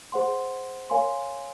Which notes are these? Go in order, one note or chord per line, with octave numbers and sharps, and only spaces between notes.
G#4 C5 F#5 C6
A#4 C#5 F5 G#5 C6